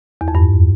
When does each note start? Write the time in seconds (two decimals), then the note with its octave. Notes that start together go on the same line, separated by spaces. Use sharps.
0.21 E2
0.28 F2
0.35 G2